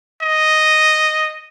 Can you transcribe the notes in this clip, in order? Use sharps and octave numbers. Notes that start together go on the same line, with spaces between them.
D#5